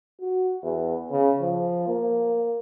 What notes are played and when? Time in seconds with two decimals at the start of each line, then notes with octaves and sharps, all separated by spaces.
0.21 F#4
0.63 E2
1.11 C#3
1.42 F3
1.88 A#3